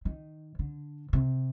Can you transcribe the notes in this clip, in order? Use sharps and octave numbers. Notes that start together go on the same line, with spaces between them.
D#3
D3
C3